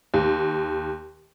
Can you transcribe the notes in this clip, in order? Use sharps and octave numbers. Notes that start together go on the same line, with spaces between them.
D#2